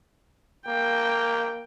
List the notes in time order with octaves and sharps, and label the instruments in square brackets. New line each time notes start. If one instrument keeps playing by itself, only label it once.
[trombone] A#3 [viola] G5